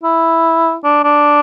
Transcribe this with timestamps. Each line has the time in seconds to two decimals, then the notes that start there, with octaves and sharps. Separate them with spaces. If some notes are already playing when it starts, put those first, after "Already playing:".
0.03 E4
0.84 D4
1.04 D4